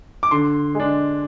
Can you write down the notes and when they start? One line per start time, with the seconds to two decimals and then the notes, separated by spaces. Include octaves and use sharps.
0.23 D6
0.31 D3 C6
0.75 G#3 D4